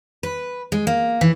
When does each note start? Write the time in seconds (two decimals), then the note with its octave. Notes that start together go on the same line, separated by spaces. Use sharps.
0.23 B4
0.72 G#3
0.87 A#3
1.21 E3